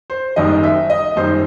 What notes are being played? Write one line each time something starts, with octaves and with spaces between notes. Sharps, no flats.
C5
F#1 F#2 D#3 G3 D#5
E5
D#5
F#1 F#2 D#3 G3 C5